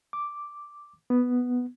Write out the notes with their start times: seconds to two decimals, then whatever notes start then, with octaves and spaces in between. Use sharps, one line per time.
0.13 D6
1.10 B3